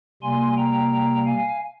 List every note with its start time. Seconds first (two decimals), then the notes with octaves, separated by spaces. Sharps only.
0.22 C3 G3 A#3 G#5 C6
0.57 G5 A#5
1.26 F5 G#5